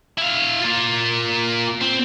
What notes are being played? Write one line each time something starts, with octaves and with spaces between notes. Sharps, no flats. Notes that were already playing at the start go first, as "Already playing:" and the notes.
E4 F5
A#3 F4
C4